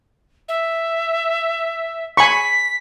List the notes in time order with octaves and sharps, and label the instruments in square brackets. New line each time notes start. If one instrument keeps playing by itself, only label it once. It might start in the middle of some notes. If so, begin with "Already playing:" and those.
[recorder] E5
[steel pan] G#5 B5 C#6 [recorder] B6